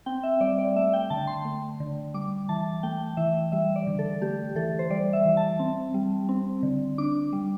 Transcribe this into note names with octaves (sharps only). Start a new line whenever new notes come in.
C4 G5
E5
G3 D5
D5
A3 E5
G5
D3 A5
C6
A3
D3
G3 D6
E3 A5
A3 G5
E3 E5
G3 E5
D5
D3
A4
A3 G4
E3 A4
C5
G3 D5
E5
E3
A5
C4
G3
C4
D3
D4 D6
G3